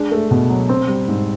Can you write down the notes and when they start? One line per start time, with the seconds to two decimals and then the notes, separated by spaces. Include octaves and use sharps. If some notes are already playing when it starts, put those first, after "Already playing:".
Already playing: G#3 D4
0.11 A3
0.31 B2
0.50 F#3
0.69 C4
0.88 G3
1.08 G#2